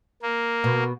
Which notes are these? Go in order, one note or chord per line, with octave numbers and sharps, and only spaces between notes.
A#3
B2